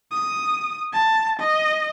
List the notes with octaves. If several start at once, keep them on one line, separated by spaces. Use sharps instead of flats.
D#6
A5
D#5